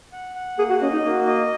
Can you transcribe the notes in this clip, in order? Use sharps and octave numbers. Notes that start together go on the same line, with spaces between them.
F#5
F#5
A#3 G#4
F#4
C#4 D#5
D#4
A#3 F#4
D#5